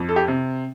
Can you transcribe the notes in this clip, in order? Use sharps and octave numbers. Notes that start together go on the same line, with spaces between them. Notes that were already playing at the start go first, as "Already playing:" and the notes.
Already playing: F2
A4
G4
C3